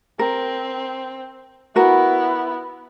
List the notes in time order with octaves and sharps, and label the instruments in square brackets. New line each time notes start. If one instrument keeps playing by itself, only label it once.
[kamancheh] C4 [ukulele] A#4
[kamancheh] B3 E4 [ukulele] F#4 A#4